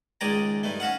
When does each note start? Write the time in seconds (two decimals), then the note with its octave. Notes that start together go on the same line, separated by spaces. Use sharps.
0.21 C#2 D#3 G#3 D5 G#5 A#5
0.63 G2 D#3 A3
0.80 C#4 F#4 F5 F#5